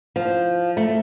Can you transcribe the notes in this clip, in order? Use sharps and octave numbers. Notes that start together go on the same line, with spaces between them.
F3
A3